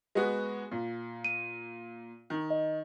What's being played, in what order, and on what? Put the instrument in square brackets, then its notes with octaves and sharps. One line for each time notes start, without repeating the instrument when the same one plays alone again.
[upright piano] G#3 B3 F#4
A#2
[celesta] D#7
[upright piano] D#3
[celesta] D#5